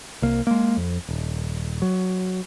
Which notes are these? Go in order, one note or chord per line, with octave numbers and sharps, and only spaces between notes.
C2 A#3
G#3 A#3
F2
D#1
F#3